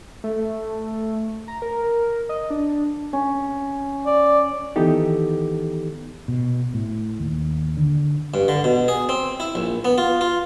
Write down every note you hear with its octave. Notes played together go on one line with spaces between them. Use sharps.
A3
A#5
A#4
D#5
D4
C#4
D5
D#3 E3 B3 D#4 G4 A4
B2
A2
D#2
D3
G2
D3
B2
G#4
C4
E4
A#1
B3
F4
F4